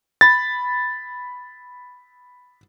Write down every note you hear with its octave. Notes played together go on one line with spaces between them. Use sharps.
B5 A6